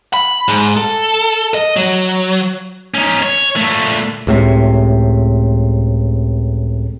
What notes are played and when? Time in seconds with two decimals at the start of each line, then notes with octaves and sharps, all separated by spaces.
0.14 B5
0.48 G#2
0.77 A4
1.54 D#5
1.76 F#3
2.94 C#4 D#4
3.23 C#5
3.56 A#2 A3
4.27 C#2 A2 C3